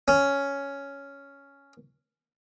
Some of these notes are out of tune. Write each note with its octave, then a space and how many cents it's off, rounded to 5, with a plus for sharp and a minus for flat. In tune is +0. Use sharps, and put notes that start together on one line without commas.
C#4 +5